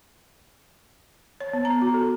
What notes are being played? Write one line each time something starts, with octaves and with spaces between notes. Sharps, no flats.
C#5
B3
A#5
F#4
A4